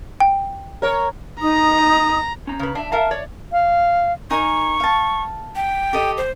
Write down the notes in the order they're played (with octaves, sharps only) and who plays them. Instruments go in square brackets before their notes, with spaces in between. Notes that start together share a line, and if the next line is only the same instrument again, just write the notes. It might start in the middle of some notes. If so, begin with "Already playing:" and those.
[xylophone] G5
[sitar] A#4 C#5
[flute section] D#4 D#6 [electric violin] A#5
[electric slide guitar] C#4 A#5
[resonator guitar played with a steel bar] C#3 B4
[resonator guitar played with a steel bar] D4 [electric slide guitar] E5 F5
[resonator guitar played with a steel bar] A#4 E5 F5 [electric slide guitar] A5
[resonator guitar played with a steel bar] C#5 [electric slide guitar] D5
[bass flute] F5
[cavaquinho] D#4 A#4 G#5 [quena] C#6
[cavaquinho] F5 A5
[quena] G5
[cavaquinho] G4 A4 D#5
[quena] C5